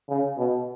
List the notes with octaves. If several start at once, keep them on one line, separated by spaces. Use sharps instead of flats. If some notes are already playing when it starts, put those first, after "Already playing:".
C#3
B2